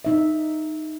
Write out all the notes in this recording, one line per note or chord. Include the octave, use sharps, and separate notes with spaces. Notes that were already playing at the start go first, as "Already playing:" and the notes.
D#4 E5